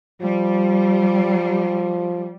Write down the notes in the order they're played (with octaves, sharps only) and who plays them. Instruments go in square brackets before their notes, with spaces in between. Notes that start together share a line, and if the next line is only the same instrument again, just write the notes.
[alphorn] F3 [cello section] G3